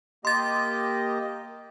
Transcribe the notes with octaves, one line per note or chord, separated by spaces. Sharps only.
A#3 G4 D#5 C6 A6